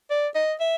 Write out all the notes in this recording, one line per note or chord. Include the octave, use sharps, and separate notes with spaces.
D5
D#5
E5